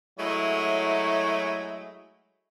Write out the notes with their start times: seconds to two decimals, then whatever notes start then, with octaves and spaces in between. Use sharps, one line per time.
0.19 F#3 G#3 A3 E4 C#5